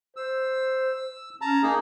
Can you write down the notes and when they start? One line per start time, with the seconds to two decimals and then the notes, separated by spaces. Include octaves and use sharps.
0.16 C5 E6
1.41 C#4 A5 A#5
1.63 A#3 D#4 G#4